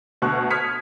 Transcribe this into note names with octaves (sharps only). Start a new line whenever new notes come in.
D2 B2 C#6 F#6
D#6 F6 G#6 B6 C#7